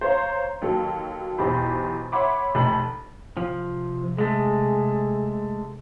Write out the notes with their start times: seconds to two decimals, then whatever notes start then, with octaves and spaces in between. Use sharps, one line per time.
0.01 C5 C#5 F5 A#5
0.62 D#2 F#3 A4
1.38 B1 E2 G4 C5 B5
2.12 C#5 E5 F#5 B5 C6 D6
2.55 F1 A3 D#4 A5 B5 F#7
3.37 C3 F3
4.18 G#3 A3 G#4